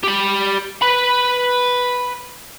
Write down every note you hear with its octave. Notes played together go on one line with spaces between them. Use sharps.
G4 B5
B4 B5